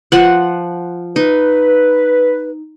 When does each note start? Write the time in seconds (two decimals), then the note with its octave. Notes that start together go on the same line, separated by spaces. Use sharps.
0.12 F3 F#5
1.16 D#4 B4